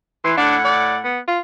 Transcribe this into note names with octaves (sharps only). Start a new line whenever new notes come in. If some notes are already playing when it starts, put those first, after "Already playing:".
E3 C6
A2 D4 F#5
D5
B3
F4